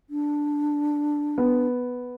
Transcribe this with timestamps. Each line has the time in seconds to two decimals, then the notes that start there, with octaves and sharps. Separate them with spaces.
0.10 D4
1.38 B3